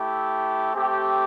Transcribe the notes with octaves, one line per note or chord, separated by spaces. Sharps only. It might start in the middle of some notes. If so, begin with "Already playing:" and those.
Already playing: A3 E4 G4
A3 C4 G4